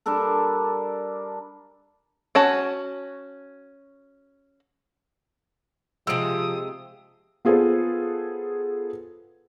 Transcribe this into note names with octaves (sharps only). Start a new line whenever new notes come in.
G3 D4 A4 A#4
C#4 F#4 A5
C3 F3 G#3 D#6 E6 D7
B3 F4 G#4 A4 B4 C5